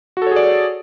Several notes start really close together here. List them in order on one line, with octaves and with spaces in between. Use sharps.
F#4 A4 C#5 G#4 D5